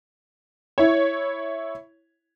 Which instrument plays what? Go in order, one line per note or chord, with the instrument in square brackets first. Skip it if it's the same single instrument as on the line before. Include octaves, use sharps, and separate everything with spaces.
[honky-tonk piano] E4 C#5